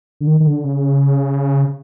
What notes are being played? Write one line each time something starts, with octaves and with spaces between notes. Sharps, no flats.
D3
D#3
D#3
D3
C#3